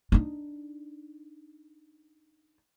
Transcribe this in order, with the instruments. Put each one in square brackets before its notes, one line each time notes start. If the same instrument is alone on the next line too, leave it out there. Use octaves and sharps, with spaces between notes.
[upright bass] D4 D#4